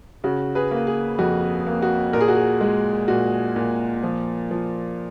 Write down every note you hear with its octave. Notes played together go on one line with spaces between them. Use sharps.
C#3 F#4
G#4 B4
A#3
G#4
F2 F#4
A#3
F#4
A#2 A#4
G#4
F#4
G#4
G#3
A#2 F#4
A#2
F3
F3